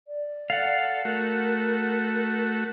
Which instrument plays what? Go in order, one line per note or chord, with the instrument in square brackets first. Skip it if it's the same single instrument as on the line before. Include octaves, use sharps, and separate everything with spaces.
[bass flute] D5
[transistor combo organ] A4 [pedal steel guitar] F5 F#5
[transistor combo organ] A3 F#4 [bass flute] A#4